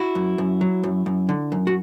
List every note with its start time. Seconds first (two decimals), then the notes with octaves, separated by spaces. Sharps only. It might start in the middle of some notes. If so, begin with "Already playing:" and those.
Already playing: E4 F#4
0.15 F#2
0.38 F#2
0.61 F#3
0.83 F#2
1.06 F#2
1.29 D3
1.52 F#2
1.67 F#4